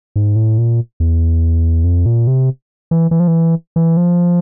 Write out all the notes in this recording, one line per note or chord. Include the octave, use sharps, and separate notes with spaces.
G#2
A2
A#2
E2
F2
A#2
C3
E3
E3
F3
E3
E3
F3